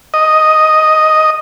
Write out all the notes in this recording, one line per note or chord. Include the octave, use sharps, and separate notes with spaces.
D#5